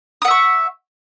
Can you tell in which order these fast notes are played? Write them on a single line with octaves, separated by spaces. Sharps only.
D#6 F#5 E5 C#6